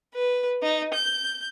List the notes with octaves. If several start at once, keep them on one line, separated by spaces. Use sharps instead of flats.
B4
D#4
G6